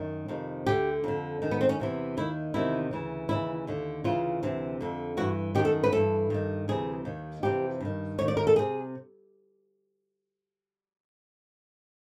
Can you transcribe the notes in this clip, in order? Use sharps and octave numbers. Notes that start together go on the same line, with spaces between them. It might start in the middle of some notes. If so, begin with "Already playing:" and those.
Already playing: F#2 D#3
F2 C3 D#3
D2 D3 G4
F2 D3
F#2 D#3
B3
C4
C#4
E2 C3 E3
D#2 D#3 E4
E2 C3 D#3 E4
D2 C#3 E3
D#2 C#3 E3 E4
D#2 D3
D2 C#3 E3 F4
D2 C3 E3
F2 D3
G2 E3 F#4
F#2 D#3 G4
A4
B4
G2 E3 A4
G2 D#3
D2 C3 E3 G#4
D#2 D#3
F2 C3 E3 G4
G2 D#3
D#2 D#3 C#5
D5
A#4
A4
C3 G#4